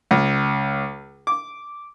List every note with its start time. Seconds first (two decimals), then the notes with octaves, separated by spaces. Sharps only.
0.11 C#2
1.27 D6